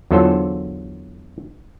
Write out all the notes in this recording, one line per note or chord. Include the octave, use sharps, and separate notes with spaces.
E2 D3 F#3 F4 A4 C5